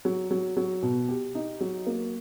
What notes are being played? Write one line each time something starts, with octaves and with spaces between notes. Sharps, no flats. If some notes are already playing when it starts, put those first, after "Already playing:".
F#3
F#3
F#3
B2
G4
D#4
F#3
A#3